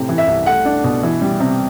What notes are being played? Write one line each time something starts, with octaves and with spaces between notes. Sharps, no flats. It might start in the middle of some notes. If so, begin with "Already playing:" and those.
Already playing: A2 C3
E3
E5
C2
A3 F#5
D4
B2
E3
G3
C3